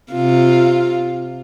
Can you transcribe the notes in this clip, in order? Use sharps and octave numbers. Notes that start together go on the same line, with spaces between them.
C3 F4